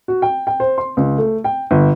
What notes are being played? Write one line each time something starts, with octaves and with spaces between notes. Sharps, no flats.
F#4
G5
G5
C5
C6
C#2
A3
G5
G1